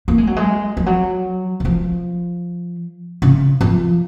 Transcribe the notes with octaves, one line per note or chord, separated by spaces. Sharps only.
A#3
G#3
F#3
G#3
F3
F#3
D#3
F3
C#3
F3